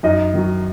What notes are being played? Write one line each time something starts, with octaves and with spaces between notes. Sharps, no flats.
F#2 D#4 D#5
D#3 F#3